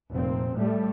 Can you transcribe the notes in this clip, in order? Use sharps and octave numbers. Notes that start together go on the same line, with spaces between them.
F1 A#2 C4
A2 G3 A3